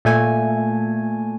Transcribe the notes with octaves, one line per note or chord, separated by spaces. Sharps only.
A#2 A3 G#5